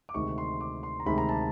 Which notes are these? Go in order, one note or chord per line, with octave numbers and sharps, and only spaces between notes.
D6
D2 C3 D#3 G#3 C#6
C6
D6
C6
A#5
D2 C3 D#3 G#3 B5
A#5
A5